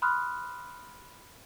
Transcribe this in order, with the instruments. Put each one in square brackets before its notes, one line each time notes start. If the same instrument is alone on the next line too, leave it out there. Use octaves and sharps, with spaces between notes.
[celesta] B5 C6 D#6 F6 F#6